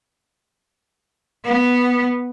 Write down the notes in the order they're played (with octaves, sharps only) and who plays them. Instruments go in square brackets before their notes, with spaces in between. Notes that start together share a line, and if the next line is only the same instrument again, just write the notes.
[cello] B3